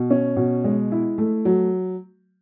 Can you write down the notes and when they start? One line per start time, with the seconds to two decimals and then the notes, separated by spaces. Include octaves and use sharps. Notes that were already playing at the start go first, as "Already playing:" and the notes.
Already playing: B2
0.10 C#4
0.36 B2
0.64 G#3
0.92 E4
1.18 A3
1.45 F#3